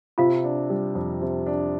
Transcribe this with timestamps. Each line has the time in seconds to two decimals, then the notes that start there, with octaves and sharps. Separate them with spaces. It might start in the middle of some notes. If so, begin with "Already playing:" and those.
0.18 C3 F4 F5
0.44 D4
0.70 G3
0.95 F2
1.22 C3
1.46 D4